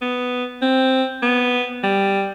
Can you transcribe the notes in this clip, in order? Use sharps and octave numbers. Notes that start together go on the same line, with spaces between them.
B3
C4
B3
G3